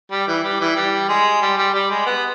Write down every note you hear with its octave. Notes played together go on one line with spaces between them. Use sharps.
G3
E3
G3
E3
G3
G#3
G3
G3
G3
G#3
B3